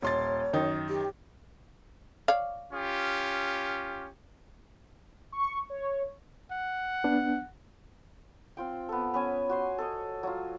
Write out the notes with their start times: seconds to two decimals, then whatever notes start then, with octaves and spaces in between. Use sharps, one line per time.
0.02 D#1 C#5 C6 A6
0.53 F#2 D#3 D#4
0.89 G4
2.28 C#5 D5 F5
2.73 C#4 F4 G4
5.32 C#6
5.70 C#5
6.51 F#5
7.04 B3 D4
8.57 C4 F4 G5
8.89 B3 A4
9.14 B3 C#4 G#5
9.50 F#4 C5 C6
9.78 A4 C#5 D#5
10.23 F#3 F4